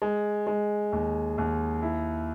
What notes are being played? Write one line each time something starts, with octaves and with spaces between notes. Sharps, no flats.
G#3
G#3
D#2
D#2
E4